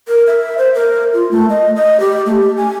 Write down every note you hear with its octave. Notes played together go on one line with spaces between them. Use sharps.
A#4
E5
C5
A#4
F4
A3
D#5
D#5
G4
A3
G4
G#5